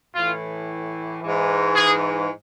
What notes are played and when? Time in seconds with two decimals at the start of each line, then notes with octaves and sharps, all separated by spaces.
0.14 A2 E3 F4
1.21 G#2 E3
1.75 G#4